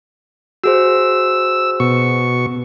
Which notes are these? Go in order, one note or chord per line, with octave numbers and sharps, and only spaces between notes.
F#4 G#4 C5 E6
B2 C#6